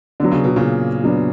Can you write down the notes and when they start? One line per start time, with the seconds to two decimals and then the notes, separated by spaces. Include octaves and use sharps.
0.20 D3 F#3 B3 D4
0.32 C#3
0.44 B2
0.56 A#2 C#3
1.04 F#3 B3 D4